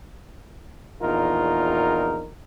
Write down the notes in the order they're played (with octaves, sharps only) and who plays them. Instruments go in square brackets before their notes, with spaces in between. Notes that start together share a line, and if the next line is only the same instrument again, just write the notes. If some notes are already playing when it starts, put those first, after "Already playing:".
[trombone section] A#1 E2 D#4 F4 A#4